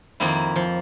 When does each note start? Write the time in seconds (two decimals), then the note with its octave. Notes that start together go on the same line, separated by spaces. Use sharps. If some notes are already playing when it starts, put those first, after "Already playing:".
0.20 F2 D#3 A#3 E4
0.56 F3